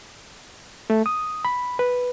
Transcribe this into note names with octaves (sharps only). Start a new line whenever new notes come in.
A3
D#6
B5
B4